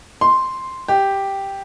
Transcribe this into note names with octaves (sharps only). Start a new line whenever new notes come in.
C6
G4